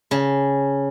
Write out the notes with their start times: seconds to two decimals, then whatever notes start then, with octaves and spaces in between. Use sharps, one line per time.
0.11 C#3 A5